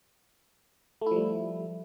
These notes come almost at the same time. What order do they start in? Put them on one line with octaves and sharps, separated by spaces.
A3 E4 F3 G3